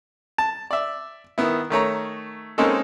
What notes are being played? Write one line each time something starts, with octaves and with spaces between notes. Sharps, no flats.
A5
D5 E5
D#3 B3 E4
D#3 A3 C#5 A#5
G#3 A#3 C4 C#4 D#4 A4